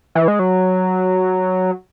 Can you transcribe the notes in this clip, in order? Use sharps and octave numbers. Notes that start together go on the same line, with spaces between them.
E3
G#3
F#3